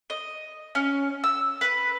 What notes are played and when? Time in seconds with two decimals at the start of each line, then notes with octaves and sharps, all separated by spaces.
0.10 D#5
0.75 C#4
1.24 E6
1.61 B4